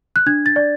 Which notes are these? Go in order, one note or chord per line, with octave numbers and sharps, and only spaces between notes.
F#6
D4 G#6
A6
D5